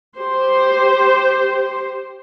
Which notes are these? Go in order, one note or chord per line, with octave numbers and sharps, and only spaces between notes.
G4 C5